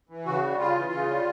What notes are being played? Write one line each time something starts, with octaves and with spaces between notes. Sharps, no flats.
E3
C#3 F#4
G3
C#3 F4
E3
C#3
G3